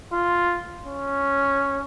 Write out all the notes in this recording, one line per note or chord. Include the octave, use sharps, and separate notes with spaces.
F4
C#4